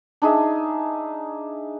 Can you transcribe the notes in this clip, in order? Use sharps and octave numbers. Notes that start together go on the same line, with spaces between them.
D4 D#4 G#4 E5